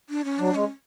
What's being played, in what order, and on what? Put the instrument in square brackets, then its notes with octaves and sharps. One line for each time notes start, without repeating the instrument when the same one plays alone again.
[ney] D4
C#4
[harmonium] F#3 [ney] D4
[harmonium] G#3 [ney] C#4